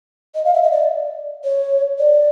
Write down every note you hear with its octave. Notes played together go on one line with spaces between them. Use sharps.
D#5
F5
E5
D#5
D5
C#5
D5